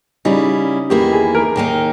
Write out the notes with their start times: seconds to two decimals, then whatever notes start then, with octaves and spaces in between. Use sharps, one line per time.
0.25 C#3 G3 C#4 D#4 E4
0.90 E2 D#3 A#3 E4 G4
1.12 G#4
1.35 A#4
1.56 D#2 D#3 A#3 D#4